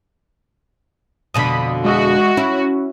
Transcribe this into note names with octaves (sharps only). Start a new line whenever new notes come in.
F2 B2 D3 B5 D#6
G#3 F#4 D#5 E5
C#4 E4